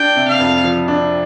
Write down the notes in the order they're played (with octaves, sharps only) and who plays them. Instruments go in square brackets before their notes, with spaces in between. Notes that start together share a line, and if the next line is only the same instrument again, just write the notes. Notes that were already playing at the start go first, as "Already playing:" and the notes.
Already playing: [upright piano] D4 [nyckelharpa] G5
[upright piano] C3
[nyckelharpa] F5
[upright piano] F2
F3
D4